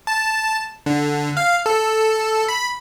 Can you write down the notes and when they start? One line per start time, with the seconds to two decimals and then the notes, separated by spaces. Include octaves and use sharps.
0.07 A5
0.86 D3
1.37 F5
1.66 A4
2.48 B5